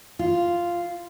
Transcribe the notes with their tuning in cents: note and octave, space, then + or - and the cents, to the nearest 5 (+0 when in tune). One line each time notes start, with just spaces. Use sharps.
F4 -5